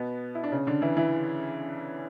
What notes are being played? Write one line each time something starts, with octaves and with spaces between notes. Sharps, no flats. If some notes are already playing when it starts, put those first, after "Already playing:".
Already playing: B2 B3
E4
D4
C#3 C#4
D3 D4
E3 E4
E3 E4